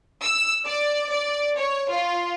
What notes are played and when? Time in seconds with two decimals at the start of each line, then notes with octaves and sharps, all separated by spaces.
0.22 E6
0.65 D5
1.11 D5
1.57 C#5
1.89 F4